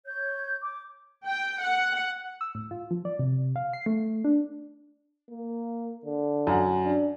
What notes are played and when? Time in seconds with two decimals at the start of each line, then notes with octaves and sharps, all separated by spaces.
0.06 C#5 G6
0.61 D6
1.26 G5
1.62 F#5
2.41 E6
2.55 A2
2.71 F4
2.91 F3
3.05 D5
3.19 C3
3.56 F5
3.73 C7
3.86 A3
4.25 D4
5.31 A#3
6.05 D3
6.47 F#2 F#5
6.84 D4